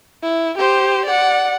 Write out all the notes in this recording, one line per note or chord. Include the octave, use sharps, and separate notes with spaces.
E4
G4 C5
D5 F#5